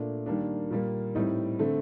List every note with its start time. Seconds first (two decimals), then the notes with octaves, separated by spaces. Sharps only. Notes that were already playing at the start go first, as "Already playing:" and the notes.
Already playing: A#2 A3 D4
0.26 D#3 G3 A#3 D4
0.70 A#2 G3 A#3
1.15 A2 G3 C4 D#4
1.59 D3 A3 C4